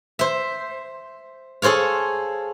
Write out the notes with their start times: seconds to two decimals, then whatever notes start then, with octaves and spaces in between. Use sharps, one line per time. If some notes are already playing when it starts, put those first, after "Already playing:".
0.19 C5 E5
1.62 G#4 A4 C5 C#5 F5